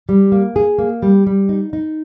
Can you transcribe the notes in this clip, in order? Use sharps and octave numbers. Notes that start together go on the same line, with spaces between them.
G3
A#3
G#4
A#3
G3
G3
D#4
D#4